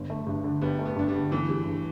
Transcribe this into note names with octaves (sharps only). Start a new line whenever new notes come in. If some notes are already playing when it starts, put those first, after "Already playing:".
Already playing: G1
A3
G2
D3
G1 G3 B3
A3
G3 B3
G2 D4
G3 B3
D3
G1 E3 A3
G3
G2